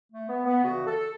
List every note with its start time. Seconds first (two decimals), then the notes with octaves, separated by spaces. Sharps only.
0.11 A3
0.28 B3
0.45 B3
0.63 D2 C#3 E3 F#4
0.87 A4